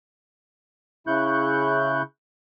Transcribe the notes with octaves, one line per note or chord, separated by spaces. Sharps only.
C#3 E4 C#6 F#6 G6